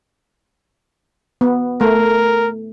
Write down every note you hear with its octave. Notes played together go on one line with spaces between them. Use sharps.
B3
A3 A#4